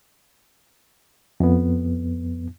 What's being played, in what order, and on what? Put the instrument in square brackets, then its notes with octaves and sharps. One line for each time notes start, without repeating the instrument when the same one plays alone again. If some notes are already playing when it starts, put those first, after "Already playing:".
[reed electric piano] F2 B3